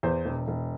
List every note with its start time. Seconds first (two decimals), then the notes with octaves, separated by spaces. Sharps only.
0.03 E2 C5
0.25 E1
0.48 E1